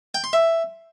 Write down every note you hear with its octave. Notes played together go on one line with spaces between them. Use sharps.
G5
C6
E5